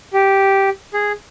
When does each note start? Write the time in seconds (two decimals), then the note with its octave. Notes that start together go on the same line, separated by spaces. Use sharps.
0.13 G4
0.94 G#4